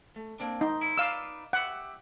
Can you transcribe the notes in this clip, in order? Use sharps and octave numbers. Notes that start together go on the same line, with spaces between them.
A3
A#3 C4 D4
D#4 C5
E4 C5
D#4 B4 D5 F5 E6
G4 E5 F#5